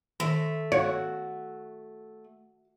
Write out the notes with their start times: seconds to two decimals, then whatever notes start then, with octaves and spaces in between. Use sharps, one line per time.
0.20 D#3 A3
0.72 F#4 C#5 F5